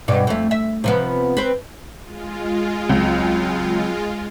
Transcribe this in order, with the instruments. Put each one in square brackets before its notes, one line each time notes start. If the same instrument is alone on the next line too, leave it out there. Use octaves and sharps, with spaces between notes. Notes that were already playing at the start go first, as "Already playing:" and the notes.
[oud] G2 B2 D5
F2 A3
E5
C3 F3 B3
C4 B4
[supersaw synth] G#3 F4
[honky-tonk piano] C#2 [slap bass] F#3 C4